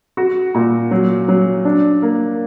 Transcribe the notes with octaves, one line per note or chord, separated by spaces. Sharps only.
F#4
A#2
F#3
F#3
D4
A#3